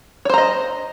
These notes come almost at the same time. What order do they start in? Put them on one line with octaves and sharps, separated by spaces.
C#5 C5 A#5 D#5